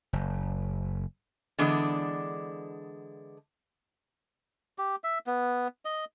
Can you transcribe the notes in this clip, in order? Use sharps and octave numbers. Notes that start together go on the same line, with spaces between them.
F#1
D3 E3 G#3 B3 D4
G4
E5
B3
D#5